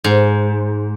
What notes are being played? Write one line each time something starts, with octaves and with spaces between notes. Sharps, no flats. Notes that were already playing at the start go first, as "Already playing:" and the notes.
G#2